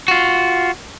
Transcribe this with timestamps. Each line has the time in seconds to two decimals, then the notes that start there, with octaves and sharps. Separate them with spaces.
0.08 F4 F#4